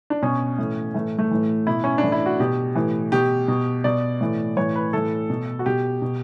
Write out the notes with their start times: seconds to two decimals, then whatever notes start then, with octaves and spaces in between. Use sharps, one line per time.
0.10 D4
0.22 B2 C#4
0.58 A2 E3
0.94 A2 E3 A3
1.19 A3
1.31 A2 E3
1.67 B2 E4
1.84 C#4
1.98 D4
2.03 A2 E3
2.12 E4
2.26 F#4
2.40 B2 G4
2.75 A2 E3
3.12 B2 G4
3.48 B2
3.84 B2 D5
4.21 A2 E3
4.57 A2 E3 C#5
4.76 B4
4.93 A2 E3 A4
5.30 B2
5.59 F#4
5.66 B2 G4
6.02 B2